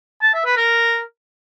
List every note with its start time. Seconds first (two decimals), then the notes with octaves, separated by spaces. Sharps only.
0.22 A5
0.34 E5
0.45 B4
0.57 A#4